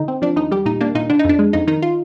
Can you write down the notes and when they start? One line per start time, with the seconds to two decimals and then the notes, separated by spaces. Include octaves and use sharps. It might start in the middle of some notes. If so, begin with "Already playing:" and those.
Already playing: D3 D#4
0.08 C4
0.22 F3 D4
0.36 D#2 D#4
0.51 G3 G4
0.65 A#2 D#4
0.81 A#3 D4
0.95 A#2 D#4
1.10 D3 D4
1.19 D#4
1.24 F2 D4
1.39 G#3
1.53 F2 D#4
1.67 D#3 D#4
1.82 F4